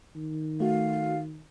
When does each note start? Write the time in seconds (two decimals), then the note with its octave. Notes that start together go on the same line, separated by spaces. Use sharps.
0.16 D#3
0.60 A3 F#4 F5